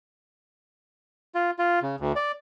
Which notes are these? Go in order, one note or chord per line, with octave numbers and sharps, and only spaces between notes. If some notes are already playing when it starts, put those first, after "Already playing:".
F4
F4
C#3
D2
D5